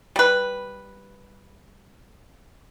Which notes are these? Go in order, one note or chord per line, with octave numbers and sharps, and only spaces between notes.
G3 B4